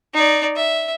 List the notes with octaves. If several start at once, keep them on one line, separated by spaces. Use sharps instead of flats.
D#4 D5
E5